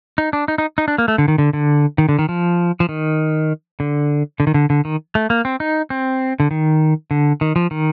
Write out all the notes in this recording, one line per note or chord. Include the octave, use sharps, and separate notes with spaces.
D#4
D4
D#4
D#4
D#4
D4
A#3
A3
D3
D#3
D3
D3
D#3
D3
D#3
F3
F3
D#3
D3
D3
D#3
D3
D3
D#3
A3
A#3
C4
D#4
C4
D3
D#3
D3
D#3
F3
D#3